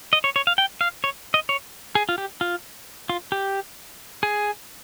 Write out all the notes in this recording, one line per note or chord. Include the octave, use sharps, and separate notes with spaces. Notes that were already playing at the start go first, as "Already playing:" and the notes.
D#5
C#5
C#5
F5
G5
F5
C#5
D#5
C#5
G#4
F4
G4
F4
F4
G4
G#4